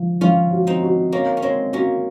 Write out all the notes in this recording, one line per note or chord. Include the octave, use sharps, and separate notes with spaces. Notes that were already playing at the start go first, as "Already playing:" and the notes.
Already playing: F3
F3 C#4 F4
F#4
C4 D#4
F#4
A#3 C#4 C#5
C#4
G#3 C4 C#5
A#3 C#4 F#4